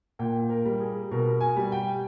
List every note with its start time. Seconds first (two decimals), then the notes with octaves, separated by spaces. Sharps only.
0.19 A#2 G5
0.49 A#4
0.66 G3
0.80 G#4
1.11 B2 A#4
1.41 G#5
1.56 G3
1.72 G5